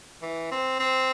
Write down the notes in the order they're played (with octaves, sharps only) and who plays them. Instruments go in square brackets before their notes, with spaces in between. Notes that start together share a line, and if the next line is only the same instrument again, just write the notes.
[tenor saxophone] E3
C4
C4